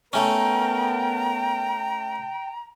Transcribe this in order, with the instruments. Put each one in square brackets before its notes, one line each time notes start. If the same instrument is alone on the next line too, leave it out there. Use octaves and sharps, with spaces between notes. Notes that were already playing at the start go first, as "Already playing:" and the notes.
[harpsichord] A3 C#4 [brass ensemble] B3 A#4 [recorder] G5 [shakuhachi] A#5